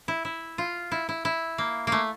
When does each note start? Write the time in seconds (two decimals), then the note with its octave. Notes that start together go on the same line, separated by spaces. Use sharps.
0.08 E4
0.25 E4
0.58 F4
0.92 E4
1.09 E4
1.25 E4
1.58 A#3
1.87 A3 A#3